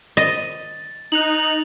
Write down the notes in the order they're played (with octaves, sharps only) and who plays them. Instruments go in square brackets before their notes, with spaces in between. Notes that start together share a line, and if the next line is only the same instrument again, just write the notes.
[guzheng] D#5 [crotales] A6
[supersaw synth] D#4 [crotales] F#6 F7 F#7